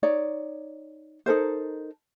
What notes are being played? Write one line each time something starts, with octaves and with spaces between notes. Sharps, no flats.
D#4 C#5 D5
D#4 A4 A#4 C5